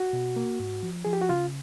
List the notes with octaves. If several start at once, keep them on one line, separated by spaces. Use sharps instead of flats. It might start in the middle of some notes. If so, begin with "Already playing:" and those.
Already playing: F#4
B2
A#3
G#2
F3
F3 G#4
G4
F#4
C#3 F4